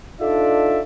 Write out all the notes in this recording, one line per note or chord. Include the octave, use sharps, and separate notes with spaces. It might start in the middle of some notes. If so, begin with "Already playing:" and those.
D4 D#4 F4 A4 D5 E5